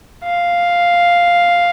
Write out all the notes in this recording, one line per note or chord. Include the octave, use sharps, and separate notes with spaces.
F5